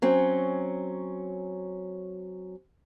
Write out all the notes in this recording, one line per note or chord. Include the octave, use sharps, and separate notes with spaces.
F#3 C4 C#4